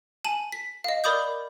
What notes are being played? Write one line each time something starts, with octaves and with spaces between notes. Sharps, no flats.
G#5 A5 D#7 F#7
B6
D#5 F5
A#4 D5 B5 D6 D#6 G6